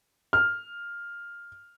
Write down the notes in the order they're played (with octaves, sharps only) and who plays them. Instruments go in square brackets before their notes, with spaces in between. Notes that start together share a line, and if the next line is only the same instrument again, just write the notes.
[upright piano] F6